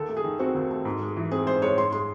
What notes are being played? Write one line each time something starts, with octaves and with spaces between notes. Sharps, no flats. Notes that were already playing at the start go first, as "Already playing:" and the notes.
Already playing: D#2 A4
A3
G#4
D#3
C4 F#4
D#2
A3
G#2
G#3
E3
C4 G#4
G#2 C5
G#3 C#5
G#2 C6
G#3 C6